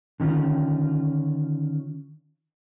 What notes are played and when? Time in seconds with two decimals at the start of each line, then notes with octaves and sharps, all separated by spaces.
0.20 D3 D#3 C#4 F4